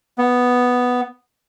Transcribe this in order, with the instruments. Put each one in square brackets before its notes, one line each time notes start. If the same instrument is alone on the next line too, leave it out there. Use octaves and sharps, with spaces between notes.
[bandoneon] B3